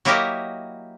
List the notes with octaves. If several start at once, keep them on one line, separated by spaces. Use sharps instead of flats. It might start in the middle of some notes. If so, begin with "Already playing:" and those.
F#3 A#3 E4 G4 A#4 D#5